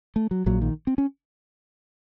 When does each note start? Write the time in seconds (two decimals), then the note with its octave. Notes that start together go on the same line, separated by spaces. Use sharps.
0.16 A3
0.31 F#3
0.46 A#1 A#2 F#3
0.62 D#3
0.87 C4
0.98 C#4